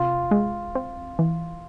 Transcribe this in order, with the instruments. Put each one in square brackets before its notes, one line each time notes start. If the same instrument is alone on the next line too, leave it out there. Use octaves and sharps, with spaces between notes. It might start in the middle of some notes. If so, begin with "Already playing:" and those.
Already playing: [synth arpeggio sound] C3 [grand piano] F4
[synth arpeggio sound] G#3
C4
E3